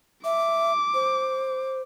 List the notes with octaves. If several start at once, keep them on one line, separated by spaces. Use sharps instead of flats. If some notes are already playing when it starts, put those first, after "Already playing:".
E5 D6
C5